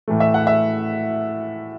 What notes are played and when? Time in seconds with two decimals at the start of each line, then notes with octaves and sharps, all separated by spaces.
0.08 A2 E3 A3
0.20 E5
0.34 F#5
0.47 E5